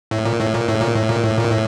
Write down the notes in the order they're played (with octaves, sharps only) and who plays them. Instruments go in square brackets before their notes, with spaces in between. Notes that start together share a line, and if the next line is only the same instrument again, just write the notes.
[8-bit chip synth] A2
A#2
A2
A#2
A2
A#2
A2
A#2
A2
A#2
A2